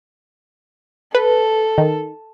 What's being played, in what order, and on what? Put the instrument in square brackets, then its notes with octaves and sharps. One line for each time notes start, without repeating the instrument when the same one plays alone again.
[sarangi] A4 [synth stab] B4
[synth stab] D#3